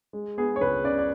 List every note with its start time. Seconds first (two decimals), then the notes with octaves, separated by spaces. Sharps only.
0.13 G#3
0.38 B3 G#4
0.56 C#5
0.61 C#2 B4
0.84 C#3 D5
0.98 D5